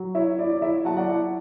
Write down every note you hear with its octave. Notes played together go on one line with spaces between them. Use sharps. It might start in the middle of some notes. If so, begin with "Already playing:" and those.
Already playing: F#3
E4 C#5 E5
E4 D5
D5
E4 C#5 E5
F#3 F#5 A5
D5 F#5
E4 D5